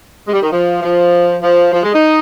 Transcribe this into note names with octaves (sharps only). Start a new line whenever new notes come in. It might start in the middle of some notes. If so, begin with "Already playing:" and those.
G#3
G3
D#3
F3
F3
F3
F3
G#3
D#4